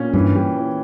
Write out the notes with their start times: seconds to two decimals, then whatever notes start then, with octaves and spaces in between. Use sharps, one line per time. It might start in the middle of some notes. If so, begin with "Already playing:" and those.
Already playing: A#2 C#4
0.13 G2 E3
0.35 G4
0.56 E3